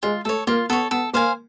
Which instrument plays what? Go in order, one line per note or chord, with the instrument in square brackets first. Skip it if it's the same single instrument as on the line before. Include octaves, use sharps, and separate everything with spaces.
[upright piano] G#3 [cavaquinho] F4
[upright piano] A3 [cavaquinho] A4
[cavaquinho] C#5
[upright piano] A#3 [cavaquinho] F4
[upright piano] B3 [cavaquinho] A4 C#5
[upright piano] B3 [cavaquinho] A4
[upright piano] A#3 [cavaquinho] C5 F5 G#5